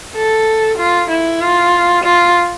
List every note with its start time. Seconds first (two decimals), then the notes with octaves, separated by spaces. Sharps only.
0.15 A4
0.78 F4
1.10 E4
1.41 F4
2.04 F4